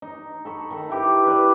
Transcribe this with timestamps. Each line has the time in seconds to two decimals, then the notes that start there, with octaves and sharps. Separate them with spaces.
0.02 D#4
0.45 A4 B5 C#6
0.71 D#3 A#5
0.90 E4 G4 B4
1.27 B4 D5 E5